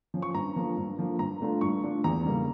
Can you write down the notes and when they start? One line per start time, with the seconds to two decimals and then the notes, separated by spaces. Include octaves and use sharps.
0.14 F3 C#4
0.22 C#6
0.34 G2 A#5
0.56 D3 F3 A#3
0.77 G2
0.98 D3 F3 A#3
1.19 G2 A#5
1.41 D3 A3 D4 F4
1.61 G2 C#6
1.83 D3 A3 D4 F4
2.04 E2 A#5
2.26 C#3 G3 A#3